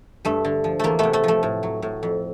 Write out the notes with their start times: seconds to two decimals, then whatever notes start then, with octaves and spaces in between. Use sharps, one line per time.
0.25 G2 A3
0.45 D3
0.64 F3
0.79 E2 A3 A#3
0.99 C3 A3 B3
1.13 A3
1.24 F3 A3
1.43 A2
1.63 F#3
1.82 A2
2.03 F2